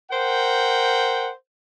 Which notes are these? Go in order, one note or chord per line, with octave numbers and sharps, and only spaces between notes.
A#4 C5 F#5 G5